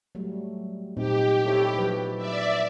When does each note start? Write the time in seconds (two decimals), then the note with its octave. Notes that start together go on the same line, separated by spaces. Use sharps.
0.15 F#3 G3 A3
0.97 A#2 C4 D#4 G4
1.46 E4 A4 C#5
1.77 F3 F#3 B4
2.17 D5 E5